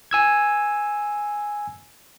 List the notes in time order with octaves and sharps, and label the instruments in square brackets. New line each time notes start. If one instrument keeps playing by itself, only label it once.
[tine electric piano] G#5 E6 G#6